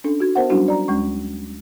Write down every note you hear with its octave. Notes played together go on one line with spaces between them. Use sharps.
C#4 D4 A4
D#4 F#4 G#6
B3 A#4 C5 E5 F#5
F#3 G3 C#4 D4 E4 F#4
D5 A#5
D2 G#3 C#4 C#6